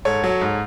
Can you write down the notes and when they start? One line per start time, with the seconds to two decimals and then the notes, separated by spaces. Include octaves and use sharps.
0.05 G#2 A4 C#5
0.24 F#3
0.41 G#2